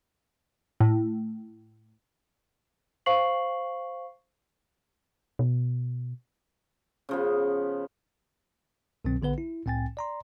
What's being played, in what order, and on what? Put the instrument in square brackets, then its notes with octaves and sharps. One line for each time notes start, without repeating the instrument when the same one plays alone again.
[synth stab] A2
[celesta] C5 F5 C#6 C7 F#7
[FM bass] B2
[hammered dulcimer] C#3 F3 B3
[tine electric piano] C2 B2 D#3 F#3 C4
A#1 D3 B3 B4 F#5
E4
C2 A2 C4 G5 G#5 A6
D5 A#5 C6